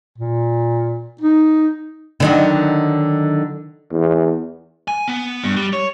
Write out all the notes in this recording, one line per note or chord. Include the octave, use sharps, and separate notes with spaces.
A#2
D#4
D3 D#3 F#3
E2
G#5
B3
G2
G3
C#5